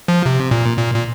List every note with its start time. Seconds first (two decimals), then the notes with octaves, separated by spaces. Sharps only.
0.08 F3
0.26 C3
0.51 A#2
0.77 A#2
0.94 A#2